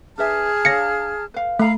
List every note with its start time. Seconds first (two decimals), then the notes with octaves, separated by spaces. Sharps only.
0.18 D4 G#4 B4 E5 A5 F6
0.65 D4 C#5 F5 A#6 C#7
1.34 B4 F5
1.59 A3 A4 F5 A#5 B5